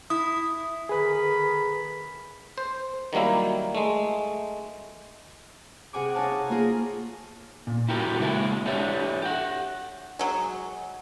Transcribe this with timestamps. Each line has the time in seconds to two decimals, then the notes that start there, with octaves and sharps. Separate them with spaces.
0.10 E4 D#6
0.89 D3 D#3 G#4 B4 B5
2.58 C5
3.13 D#3 F#3 G3 A#3 E4
3.75 G#3 A3
5.93 C3 G#4 F#5 G#5 D6
6.15 D#4 G#4 C#5 F5 G#5 A5
6.50 A#3 F4 G#4 A#4
7.67 A#2
7.89 E4 F#4 G4 A#4
8.20 C#3 G#3 A#3 E4 A#4
8.66 D4 E4 G4 C#5 E5
9.22 G4 F#5
10.19 F#3 G#3